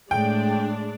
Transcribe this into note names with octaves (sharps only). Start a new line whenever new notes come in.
A2 G#3 D4 D5 G5